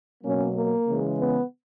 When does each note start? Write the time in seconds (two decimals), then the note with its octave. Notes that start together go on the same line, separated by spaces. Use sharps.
0.22 B2 F#3 A#3 C#4
0.55 A#3
0.87 C#3 E3 G#3
1.18 B3